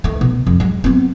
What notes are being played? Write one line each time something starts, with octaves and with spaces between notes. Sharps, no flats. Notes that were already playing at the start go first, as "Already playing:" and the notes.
D#3 A3
B2
F2
F#3 G#3
B3 C4